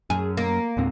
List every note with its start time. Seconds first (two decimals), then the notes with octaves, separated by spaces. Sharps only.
0.10 F#2 G#4
0.37 A#3
0.77 C#2 G#2 C4